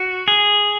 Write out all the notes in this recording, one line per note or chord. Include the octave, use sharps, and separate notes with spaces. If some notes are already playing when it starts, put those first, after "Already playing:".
Already playing: F#4
G#4